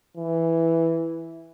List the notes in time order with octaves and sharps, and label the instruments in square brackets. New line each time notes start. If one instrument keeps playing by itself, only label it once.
[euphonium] E3